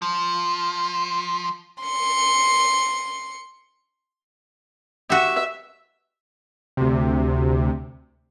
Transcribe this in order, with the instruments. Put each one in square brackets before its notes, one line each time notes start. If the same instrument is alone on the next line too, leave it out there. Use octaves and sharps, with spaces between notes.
[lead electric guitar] F3
[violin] C6 C#7
[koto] F#4 G4 [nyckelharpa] E5
[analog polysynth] D2 C3